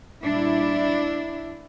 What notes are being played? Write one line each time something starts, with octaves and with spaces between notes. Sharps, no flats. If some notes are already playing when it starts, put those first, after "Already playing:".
A#2 G3 D4 E4